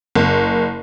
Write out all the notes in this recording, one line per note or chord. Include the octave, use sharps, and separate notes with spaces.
F#1